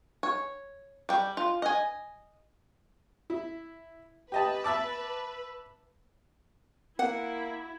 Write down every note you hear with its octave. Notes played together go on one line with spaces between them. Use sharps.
C#5
G3 G5
F4
D#5 G#5
E4
G4 B4 D#5 A5
E5 A5 D6
A#3 E4 F#5